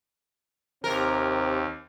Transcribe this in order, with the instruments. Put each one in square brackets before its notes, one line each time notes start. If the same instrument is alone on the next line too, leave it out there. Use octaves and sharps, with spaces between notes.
[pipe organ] D#2 [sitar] C3 A#4 [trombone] C4